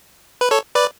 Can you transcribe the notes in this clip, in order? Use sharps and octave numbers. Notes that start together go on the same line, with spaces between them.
B4
A4 C#5
B4 D5